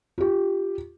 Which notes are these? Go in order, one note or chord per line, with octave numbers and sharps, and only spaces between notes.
F4 G4